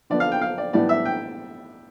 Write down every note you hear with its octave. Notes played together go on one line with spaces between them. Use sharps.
D3 F3 B3 D5
F5
G5
F5
D5
A2 E3 G3 B3 D5
E5
G5